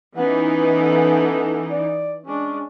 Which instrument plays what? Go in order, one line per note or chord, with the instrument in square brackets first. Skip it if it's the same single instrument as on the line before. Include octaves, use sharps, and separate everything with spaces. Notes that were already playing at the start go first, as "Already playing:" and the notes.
[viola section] E3 D#4 [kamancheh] B3 C#4 [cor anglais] F#5
[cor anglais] A4
D5
[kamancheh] G#3 D4 [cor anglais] C#4